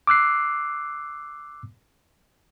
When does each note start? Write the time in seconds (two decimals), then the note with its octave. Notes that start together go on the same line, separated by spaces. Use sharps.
0.07 D6 E6 F#6 C7